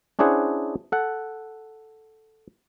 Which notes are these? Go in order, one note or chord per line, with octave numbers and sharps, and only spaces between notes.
C#4 D4 E4 G#4 C5 F#5
A4 F#5